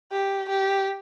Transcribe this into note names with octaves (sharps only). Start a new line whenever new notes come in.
G4
G4